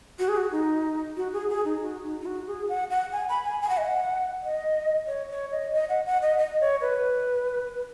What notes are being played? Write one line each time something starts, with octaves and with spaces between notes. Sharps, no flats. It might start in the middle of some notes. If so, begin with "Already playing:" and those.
F#4
G#4
F#4
D#4
F#4
G#4
G#4
D#4
F#4
D#4
D#4
F#4
G#4
F#5
F#5
G#5
B5
G#5
G#5
F#5
D#5
F#5
D#5
C#5
C#5
D#5
D#5
F#5
F#5
D#5
D#5
C#5
B4